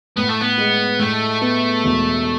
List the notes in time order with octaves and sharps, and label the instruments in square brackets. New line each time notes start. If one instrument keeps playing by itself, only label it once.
[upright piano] A2 [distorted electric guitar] B3
[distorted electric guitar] A3
B3
[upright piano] G#3
[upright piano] A2 [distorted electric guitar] A3
[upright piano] B3
E1